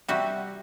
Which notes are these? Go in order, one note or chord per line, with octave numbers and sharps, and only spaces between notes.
C3 G3 F#4